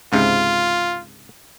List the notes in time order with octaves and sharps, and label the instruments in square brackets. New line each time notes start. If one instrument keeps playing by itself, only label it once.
[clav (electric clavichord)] C#2 G#2 C3 [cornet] F4